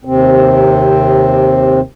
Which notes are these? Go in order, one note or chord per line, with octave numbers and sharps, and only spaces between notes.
D#2 C3 C4